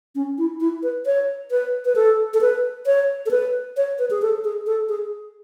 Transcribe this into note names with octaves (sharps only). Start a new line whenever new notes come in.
C#4
E4
E4
B4
C#5
B4
B4
A4
A4
B4
C#5
A4
B4
C#5
B4
G#4
A4
G#4
A4
G#4